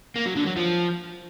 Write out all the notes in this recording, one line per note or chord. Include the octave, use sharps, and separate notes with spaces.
A#3
F#3
D3
F#3
F3